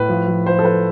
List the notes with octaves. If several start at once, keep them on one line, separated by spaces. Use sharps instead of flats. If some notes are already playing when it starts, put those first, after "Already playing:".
Already playing: A2 B4
F3
F3
F3 C5
A4
F3 B4